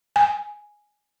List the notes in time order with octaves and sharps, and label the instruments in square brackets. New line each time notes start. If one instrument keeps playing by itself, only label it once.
[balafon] G#5